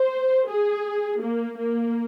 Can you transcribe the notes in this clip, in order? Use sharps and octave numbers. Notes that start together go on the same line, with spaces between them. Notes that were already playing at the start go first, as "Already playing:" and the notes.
Already playing: C5
G#4
A#3
A#3